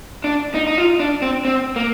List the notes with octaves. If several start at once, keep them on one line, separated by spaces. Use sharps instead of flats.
D4
D#4
D#4
F4
D4
C4
C4
A#3